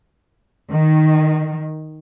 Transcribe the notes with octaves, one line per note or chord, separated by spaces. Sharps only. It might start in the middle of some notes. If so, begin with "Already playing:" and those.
D#3